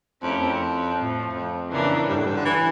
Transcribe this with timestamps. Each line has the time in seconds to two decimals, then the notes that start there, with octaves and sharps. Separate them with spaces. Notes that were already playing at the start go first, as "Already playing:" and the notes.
0.22 F2 A3 C#4 E4 G4 A#4
0.40 F2
0.97 A2 F3 A3
1.33 F2
1.70 C#3 E3 A#3 D4
2.08 G2
2.17 A2
2.27 G2
2.36 D3
2.45 E3